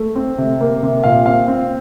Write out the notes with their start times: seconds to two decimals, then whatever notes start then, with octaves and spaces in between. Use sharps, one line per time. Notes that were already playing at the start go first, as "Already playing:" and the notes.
Already playing: A3
0.15 C4
0.38 C3
0.61 A#3
0.83 C3
1.04 A#2 F5
1.26 C4 F5
1.48 C4